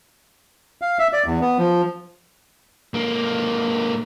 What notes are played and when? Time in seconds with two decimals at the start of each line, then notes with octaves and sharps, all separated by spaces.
0.82 F5
0.99 E5
1.13 D5
1.26 E2
1.41 B3
1.59 F3
2.94 G#2 A#3